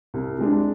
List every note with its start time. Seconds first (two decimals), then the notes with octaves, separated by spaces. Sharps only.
0.14 C2
0.39 C3 G#3 D4